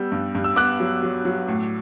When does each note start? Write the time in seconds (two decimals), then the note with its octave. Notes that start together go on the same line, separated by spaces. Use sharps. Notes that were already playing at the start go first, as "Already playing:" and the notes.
Already playing: G3 B3 E6 G6
0.12 G2
0.35 G2
0.44 E6
0.56 B3 D6 F#6
0.80 F#3
1.03 F#3
1.25 F#3
1.48 A2